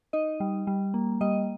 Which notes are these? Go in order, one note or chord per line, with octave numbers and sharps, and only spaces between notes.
D#4 D#5
G3
G3
A#3
G3 D#5